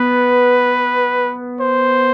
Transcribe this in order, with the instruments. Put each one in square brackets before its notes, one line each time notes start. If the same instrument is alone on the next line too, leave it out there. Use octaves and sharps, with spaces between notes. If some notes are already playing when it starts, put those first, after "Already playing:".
Already playing: [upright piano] B3 [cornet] B4
[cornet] C5